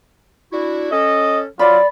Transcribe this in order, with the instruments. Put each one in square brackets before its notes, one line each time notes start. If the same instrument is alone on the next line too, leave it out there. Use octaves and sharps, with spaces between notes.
[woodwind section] D4 E4 F#4
[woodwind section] C#4 A4 [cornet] D#5
[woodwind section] F#3 [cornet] F4 [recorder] D5 [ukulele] B5